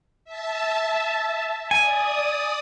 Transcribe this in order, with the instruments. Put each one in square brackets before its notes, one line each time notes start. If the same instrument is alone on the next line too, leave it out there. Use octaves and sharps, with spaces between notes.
[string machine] E5 A5
[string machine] D5 D#6 [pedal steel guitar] G#5